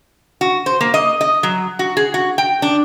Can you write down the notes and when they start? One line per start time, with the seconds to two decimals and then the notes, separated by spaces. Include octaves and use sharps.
0.41 F#4
0.66 C5
0.81 A#3
0.94 D#5
1.21 D#5
1.43 F#3
1.79 F#4
1.97 G#4
2.14 F#4
2.38 G5
2.62 D4